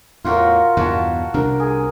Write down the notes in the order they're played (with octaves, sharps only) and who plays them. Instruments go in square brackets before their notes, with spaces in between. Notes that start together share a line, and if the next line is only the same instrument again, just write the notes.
[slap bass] E2 A2 [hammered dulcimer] F4 F#4 A#4
[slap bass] E2 G2 B2 [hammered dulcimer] F#4 A5
[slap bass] C2 C3 D4 [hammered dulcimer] A#4
[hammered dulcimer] G#4